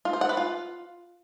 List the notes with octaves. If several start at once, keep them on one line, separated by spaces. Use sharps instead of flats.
F4
C5
F#5
B4
F4